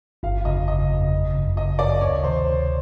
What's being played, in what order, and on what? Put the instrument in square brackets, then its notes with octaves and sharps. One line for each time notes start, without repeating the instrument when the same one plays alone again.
[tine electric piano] G1 [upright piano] F5
[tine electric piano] F2 C#3 [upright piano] D#5
[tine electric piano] G1 [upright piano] D#5
[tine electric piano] F2 C#3
G1
F#2 C#3
[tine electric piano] G1 [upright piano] D#5
[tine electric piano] F#2 C#3 [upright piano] D5
[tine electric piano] D2 [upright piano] C#5
[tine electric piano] C3 D#3 [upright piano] C5
[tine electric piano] D2